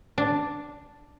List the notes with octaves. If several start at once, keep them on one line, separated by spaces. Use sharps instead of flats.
D4